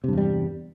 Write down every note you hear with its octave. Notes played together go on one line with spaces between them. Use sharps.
E2 G2 C3 G3